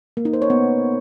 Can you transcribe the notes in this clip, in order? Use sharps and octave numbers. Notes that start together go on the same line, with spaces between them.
A#3
D#4
C5
C#5
B3